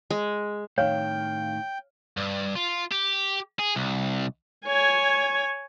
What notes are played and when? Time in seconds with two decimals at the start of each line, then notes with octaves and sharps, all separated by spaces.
0.10 G#3
0.78 A2 D#3 C#5 F5 G5
2.17 G2
2.56 F4
2.92 G4
3.59 G#4
3.76 C2
4.66 C#5 G#5